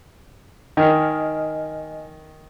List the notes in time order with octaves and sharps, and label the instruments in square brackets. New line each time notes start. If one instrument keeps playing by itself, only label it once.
[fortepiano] D#3 [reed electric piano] D#5 G#5 F6